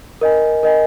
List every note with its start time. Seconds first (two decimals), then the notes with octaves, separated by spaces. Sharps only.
0.21 A#4 D#5 G#5
0.63 A#4 D#5 G#5